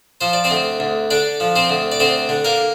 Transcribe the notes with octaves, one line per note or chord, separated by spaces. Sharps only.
F3 C5
D5
C4 C5
D2
D2
D3 D4 D5
F3
C4 C5
D2
D5
D2 C4 C5
D3
A#3 A#4